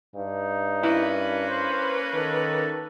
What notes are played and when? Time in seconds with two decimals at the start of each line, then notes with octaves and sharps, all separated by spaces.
0.16 G2 D#4
0.83 A#3 C#4 E4 B4
1.47 C5
2.14 D#3 A4